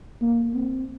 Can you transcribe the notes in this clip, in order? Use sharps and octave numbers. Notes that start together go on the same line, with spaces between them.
A#3
C4